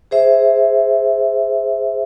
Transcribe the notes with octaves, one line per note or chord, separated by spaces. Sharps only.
G#4 C5 E5